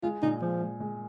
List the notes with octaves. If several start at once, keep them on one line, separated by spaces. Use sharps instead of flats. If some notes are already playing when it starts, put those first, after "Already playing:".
G#3 F4
A#2 D#4
F3 G#3
G#3
G#3